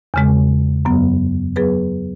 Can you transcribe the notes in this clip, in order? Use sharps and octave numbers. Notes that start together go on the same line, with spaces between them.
E2 C#3 G#3
F#2 F#3 B3
F#3 B3 G#4 B4